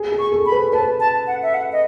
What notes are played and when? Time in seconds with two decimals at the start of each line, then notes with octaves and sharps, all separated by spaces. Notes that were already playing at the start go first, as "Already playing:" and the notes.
Already playing: G#4
0.12 G#4
0.19 C#6
0.32 A4
0.46 B5
0.52 B4
0.73 B4 A5
1.00 A5
1.27 F#5
1.42 E5
1.54 F#5
1.72 D#5